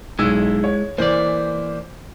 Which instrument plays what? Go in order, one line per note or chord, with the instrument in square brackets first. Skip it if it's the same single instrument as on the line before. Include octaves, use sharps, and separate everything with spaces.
[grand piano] B1 E6 [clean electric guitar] G#3 E4
[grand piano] C#5
[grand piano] E3 C5 [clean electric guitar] A#3 D5